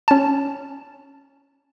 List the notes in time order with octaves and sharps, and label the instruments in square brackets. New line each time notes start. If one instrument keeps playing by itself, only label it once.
[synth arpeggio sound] C#4 A5